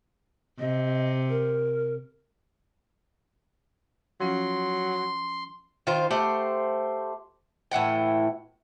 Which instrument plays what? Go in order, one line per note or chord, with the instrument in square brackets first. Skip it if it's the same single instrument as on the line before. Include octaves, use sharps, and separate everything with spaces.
[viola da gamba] C3 [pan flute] D#5
[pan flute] A#4
[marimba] F3 C#4 F4 [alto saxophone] F#3 [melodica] C6
[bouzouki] D#3 F4 C5
A3 G4 C5 F#5
A2 E3 F#5 G5